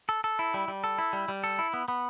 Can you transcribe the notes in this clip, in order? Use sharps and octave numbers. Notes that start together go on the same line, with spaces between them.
A4
A4
E4
G3
G3
A4
E4
G3
G3
A4
E4
B3
B3